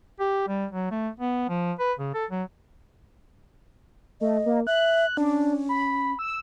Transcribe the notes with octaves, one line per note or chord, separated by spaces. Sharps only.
G4
G3
F#3
A3
B3
F3
B4
C#3
A4
F#3
A3 D#5
A#3
E5 F#6
C#4 D4
B5
E6